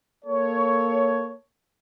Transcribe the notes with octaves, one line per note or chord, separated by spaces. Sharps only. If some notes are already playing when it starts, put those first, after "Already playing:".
A#3 A4 C#5